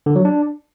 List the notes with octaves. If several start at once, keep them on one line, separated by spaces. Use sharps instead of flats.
D3
F#3
D4